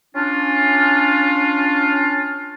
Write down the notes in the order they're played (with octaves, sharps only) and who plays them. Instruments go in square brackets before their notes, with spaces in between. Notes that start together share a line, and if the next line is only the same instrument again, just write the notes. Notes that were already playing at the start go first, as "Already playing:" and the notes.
[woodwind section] C#4 D4 F4